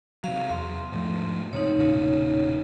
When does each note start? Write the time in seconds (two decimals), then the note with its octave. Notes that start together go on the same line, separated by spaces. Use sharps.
0.24 C3 F#3 F5
0.50 E2 C6
0.92 G#2 F3 A3
1.53 G#2 C3 D#4 C#5
1.77 E1 A#2 C#3